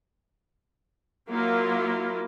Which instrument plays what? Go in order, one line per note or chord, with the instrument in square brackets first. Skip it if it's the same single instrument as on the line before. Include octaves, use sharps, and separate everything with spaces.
[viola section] F#3 A#3 E4 F4